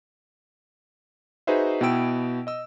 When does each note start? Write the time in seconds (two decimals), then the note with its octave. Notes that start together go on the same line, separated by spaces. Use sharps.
1.47 D#4 F#4 G#4 B4 C5 E5
1.81 B2 B3 E4 G5 E6 D7
2.47 D#5 E6